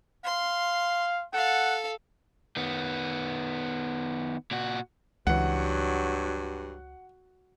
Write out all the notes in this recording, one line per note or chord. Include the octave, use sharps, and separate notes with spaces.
F5 C6
A4 F5 F#5
D#3 B3
A#2 F#4
C#2 G2 E3 F#3 F#5